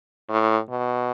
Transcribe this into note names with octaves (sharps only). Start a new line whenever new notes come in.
A2
B2